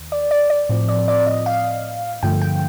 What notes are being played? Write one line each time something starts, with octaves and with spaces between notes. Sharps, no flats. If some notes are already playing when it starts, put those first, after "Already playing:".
Already playing: D#2
D5
D5
D5
A2 F3 C4
D5
D5
D#5
F5
G2 D3 F3 A3 G5
G5